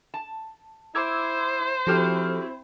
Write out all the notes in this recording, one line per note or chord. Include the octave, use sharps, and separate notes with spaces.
A5
E4 C5 D6 E6 G#6
F3 C4 E4 F#4 G4 A4 F6